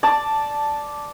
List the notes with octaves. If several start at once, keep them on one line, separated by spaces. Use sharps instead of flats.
D5 A5 D6